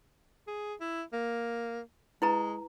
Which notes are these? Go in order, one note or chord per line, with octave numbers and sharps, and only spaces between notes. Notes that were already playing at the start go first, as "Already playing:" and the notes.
G#4
E4
A#3
G#3 E4 B4 A#5